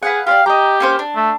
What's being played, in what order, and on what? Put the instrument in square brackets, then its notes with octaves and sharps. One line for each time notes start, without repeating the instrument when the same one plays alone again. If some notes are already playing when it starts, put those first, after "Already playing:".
[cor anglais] G#4 [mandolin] B4 F5 F#5
[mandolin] G4 C#5 D5 [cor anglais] F5
[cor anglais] G4 [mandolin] D#5 A#5
[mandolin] A#3 C#4 C5
D4
[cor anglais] A3